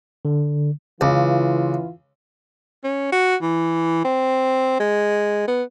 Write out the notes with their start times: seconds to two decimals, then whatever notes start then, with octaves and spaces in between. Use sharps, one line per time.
0.25 D3
1.01 C#2 E3 F4
2.84 C#4
3.12 F#4
3.42 E3
4.04 C4
4.80 G#3
5.48 B3